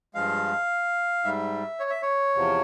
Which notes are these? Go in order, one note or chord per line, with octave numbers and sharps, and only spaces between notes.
G2 F3 G#3 F5
G#2 G3 E5
C#5
E5
C#5
E2 C3 F3